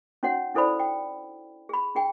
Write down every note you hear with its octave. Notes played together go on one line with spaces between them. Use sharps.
C#4 D#4 F#4 C#5 F#5
D4 E4 A4 C5 D5 B5
G5
G#4 B5
D4 G#4 G5